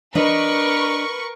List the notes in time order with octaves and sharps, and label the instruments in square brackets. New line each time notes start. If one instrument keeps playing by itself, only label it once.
[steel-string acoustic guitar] D4 D#5 [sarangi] A#4 [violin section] B4 C#6